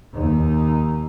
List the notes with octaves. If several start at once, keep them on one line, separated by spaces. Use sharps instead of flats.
D#2 D#4